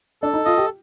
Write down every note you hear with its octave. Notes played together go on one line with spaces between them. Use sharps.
D4 A4
D#4
F4 D#5
G4